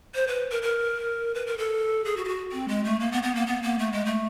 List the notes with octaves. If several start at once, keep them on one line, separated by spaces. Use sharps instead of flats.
C5
B4
A#4
A#4
B4
A#4
A4
G#4
F#4
G4
F#4
C4
G#3
A3
A#3
B3
B3
A#3
B3
A#3
A3
G#3
A3